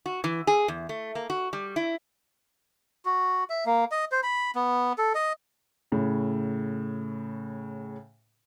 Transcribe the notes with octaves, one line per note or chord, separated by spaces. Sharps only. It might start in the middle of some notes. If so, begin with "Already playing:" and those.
F#4
E3
G#4
E2
A3
A#3
F#4
G3
E4
F#4
E5
A#3
D#5
C5
B5
B3
A4
D#5
A2 C#3 C#4